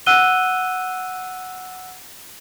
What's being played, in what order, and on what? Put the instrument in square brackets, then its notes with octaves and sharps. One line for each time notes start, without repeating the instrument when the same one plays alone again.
[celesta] F#5 E6 F#6 D#7 G7